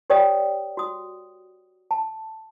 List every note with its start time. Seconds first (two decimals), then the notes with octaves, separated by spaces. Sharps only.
0.10 G4 B4 C#5 D5 G5 D#6
0.77 F#4 D#6
1.91 A5